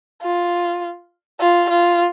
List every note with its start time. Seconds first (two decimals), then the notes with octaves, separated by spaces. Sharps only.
0.22 F4
1.41 F4
1.70 F4